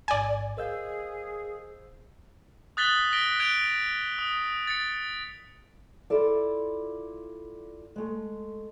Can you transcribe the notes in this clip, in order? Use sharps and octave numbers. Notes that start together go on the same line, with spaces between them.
A1 G#2 D5 G#5
G#4 A#4 C5 D#5 F5 E6 G6
D#6 F#6 A6 B6 F#7 G7
A#6 B6 D7 G7
F#6 G#6 D7 F7 G7
D#6
A6 C#7
E4 F4 A4 D5
G#3 A3